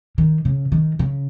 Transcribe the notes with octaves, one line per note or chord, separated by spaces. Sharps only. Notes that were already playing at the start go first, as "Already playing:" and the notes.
D#3
C#3
D#3
C#3